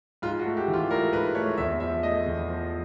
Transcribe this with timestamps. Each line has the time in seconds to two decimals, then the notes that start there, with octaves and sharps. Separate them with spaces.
0.22 G#2 F4
0.39 F#4
0.46 A3
0.57 G4
0.68 E3
0.73 F4
0.91 A3 A#4
1.13 G#2 B4
1.35 A3 C#5
1.57 E2 E5
1.80 F3 E5
2.03 A3 D#5
2.26 E2
2.49 F3